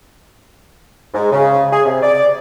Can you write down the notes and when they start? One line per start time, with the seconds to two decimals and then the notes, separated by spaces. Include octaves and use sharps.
1.13 G#2
1.32 C#3
1.71 G#4
1.85 C3
2.02 D5